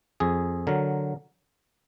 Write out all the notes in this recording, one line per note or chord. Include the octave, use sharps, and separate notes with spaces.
F2 G#4
D3 F#3 A#4